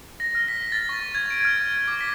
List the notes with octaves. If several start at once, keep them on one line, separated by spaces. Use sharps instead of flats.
A#6
F6
B6
A6
C#6
G#6
D7
F6
D6
B6